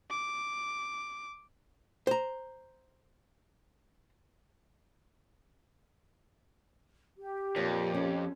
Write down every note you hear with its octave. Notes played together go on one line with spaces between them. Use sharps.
D6
C5 A#5
G4
F2 A#2 C#5
C#4 A4